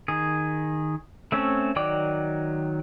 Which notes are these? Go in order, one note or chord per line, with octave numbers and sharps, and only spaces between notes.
D#3 G#4
A3 C4 C#4
D#3 F#3 D5 G5 D6